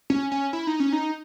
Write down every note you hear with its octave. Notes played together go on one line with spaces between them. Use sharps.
C#4
C#4
E4
D#4
C#4
D#4